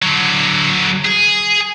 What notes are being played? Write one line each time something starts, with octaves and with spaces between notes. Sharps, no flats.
D3 F#3
G#4